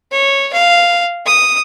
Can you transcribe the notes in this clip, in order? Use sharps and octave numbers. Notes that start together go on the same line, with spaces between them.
C#5
F5
D#6